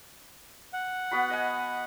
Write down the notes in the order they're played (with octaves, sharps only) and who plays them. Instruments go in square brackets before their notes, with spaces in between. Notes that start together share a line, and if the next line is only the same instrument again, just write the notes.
[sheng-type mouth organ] F#5
[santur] B3 F#4 B5
D#5 G#5